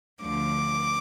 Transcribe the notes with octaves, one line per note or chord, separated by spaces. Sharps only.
D2 D3 F3 D6